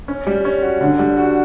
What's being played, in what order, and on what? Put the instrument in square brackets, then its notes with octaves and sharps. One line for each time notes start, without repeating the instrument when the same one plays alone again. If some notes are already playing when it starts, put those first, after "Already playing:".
[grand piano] C#4
G3
C#4
F#4
D3
G3
F#4